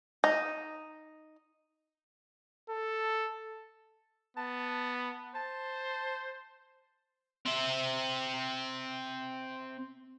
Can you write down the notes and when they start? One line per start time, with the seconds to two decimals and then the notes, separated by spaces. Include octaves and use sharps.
0.24 D#4
2.69 A4
4.37 B3 A5
5.35 C5 A5
7.46 C4 E5